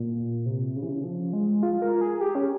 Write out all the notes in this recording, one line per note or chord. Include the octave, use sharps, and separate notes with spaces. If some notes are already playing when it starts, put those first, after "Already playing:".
Already playing: A#2
C3
C#3
E3
C#3
F3
G#3
F4
A#4
G#4
G4
C#4